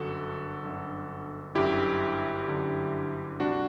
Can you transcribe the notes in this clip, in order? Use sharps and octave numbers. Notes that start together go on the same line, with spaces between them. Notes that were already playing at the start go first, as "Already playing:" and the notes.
Already playing: G1 F#2 D3 F#4 A4
G1 F#2 D3
G1 F#2 D3 E4 G4
G1 F#2 D3
D2 C3 G3 D4 F#4